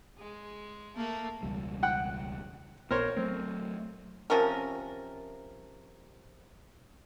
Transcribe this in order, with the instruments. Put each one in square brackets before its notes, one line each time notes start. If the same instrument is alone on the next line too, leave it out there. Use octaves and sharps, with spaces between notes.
[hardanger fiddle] G#3
[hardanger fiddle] A3 [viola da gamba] A#3
[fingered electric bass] E1 C#2 G3
[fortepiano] F#5 G5 F#6
[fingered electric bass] A#1 B3 [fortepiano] A#4 C5 C#5
[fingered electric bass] F#3 A3 [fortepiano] C4
[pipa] C3 F3 C#4 A#4